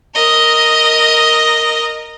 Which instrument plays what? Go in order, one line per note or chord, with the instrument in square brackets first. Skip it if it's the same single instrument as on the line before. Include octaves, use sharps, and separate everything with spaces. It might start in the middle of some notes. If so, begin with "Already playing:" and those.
[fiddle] A#4 D#5